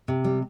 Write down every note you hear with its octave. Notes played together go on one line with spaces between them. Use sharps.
C3
G3